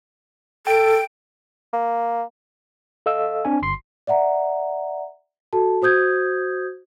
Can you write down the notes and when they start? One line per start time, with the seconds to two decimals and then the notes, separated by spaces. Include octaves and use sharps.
0.67 A4 G5 D7
1.73 A#3
3.06 A4 D#5 F5 E6
3.45 C4 D4 G#5
3.62 G1 C6 C7
4.07 D5 E5 F#5 A#5
5.53 F#4 A4 A5
5.82 F#4 C5 D#6 G6 G#6